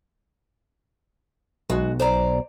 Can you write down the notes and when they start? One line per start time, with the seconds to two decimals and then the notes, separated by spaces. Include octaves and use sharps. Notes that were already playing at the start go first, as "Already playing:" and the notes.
1.70 B1 G#3 F#4
2.00 C5 D5 A#5